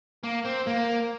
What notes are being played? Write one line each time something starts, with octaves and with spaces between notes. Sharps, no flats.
A#3
C4
A#3